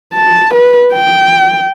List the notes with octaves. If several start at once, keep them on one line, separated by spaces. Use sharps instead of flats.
A5
B4
G5